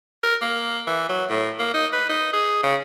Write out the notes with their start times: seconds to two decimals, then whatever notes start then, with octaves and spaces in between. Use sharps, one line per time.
0.23 A#4
0.42 A#3
0.87 E3
1.09 F#3
1.30 A2
1.59 A#3
1.74 D#4
1.93 B4
2.09 D#4
2.33 G#4
2.63 C#3